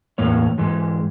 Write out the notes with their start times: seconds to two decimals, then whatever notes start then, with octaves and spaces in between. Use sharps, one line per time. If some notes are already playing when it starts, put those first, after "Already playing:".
0.18 E2 A2 A#3 C#5
0.58 G#2 E3 G#3